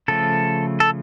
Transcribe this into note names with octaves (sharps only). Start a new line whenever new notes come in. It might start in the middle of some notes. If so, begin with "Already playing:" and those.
C#3 F3 A3 A4
A4